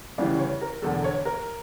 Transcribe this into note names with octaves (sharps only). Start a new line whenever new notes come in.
D2 C#3 E3 G3 D5
C#5
A#4
E1 E2 D3 A4
C#5
A#4